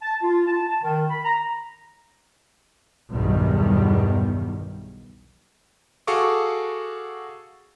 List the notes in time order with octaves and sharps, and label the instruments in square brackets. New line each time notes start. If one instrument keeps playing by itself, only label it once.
[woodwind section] A5
F4
A5
A5
D#3
B5
A#5
[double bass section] B1 E2 G2 B2 D#3 G3
[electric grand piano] F#4 G#4 A4 F5 C#6 D6